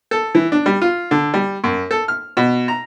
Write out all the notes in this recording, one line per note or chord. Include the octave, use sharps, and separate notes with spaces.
A4
E3
D4
G3
F4
D3
G3
F#2
A4
F6
B2
A#5